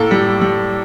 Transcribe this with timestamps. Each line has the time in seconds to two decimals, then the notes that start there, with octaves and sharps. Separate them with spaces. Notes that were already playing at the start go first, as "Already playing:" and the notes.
Already playing: A2 A#3 A4
0.11 G3
0.41 G3